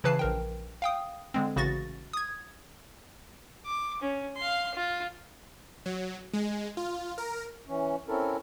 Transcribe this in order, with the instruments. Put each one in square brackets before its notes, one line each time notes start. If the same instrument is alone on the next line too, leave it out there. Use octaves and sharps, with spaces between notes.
[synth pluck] C#3 E3 B4 A5 C7
A#1 A#4 G5
F5 G5 D#6
D3 G#3 C4
A1 C#3 F#4 C#6 A6 A#6
D#6 G#6
[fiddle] D6
C#4
F5 C6
F4
[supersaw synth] F#3
G#3
F4
A#4
[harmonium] E3 C#4
C4 C#4 E4 A4 A#4